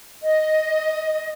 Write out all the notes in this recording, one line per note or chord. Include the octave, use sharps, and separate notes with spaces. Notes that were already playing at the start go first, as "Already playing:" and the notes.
D#5